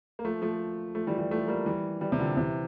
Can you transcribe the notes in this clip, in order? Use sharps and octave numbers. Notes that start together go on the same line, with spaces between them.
A#3
F3 A3
F3 A3
F3 A3
E3 G3
E3 G3
F3 A3
G3 A#3
E3 G3
E3 G3
C3
A#2 D3
C3 E3